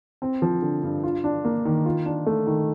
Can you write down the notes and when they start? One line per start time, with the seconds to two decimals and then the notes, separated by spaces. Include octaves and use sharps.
0.22 C4
0.42 F3
0.62 D3
0.83 G2
1.03 F4
1.24 D4
1.45 A#3
1.65 D#3
1.86 F4
2.06 D4
2.26 A3
2.47 D#3